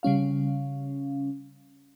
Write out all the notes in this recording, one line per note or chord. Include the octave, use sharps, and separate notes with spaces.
C#3 G3 C#4 F5